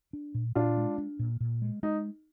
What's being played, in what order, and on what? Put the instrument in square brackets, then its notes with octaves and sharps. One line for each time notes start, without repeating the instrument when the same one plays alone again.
[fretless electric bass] D4
A#2
[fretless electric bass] A#2 [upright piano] D4 F4
[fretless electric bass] G#3
D4
A#2
A#2
G#3
[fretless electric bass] G#3 [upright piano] D#4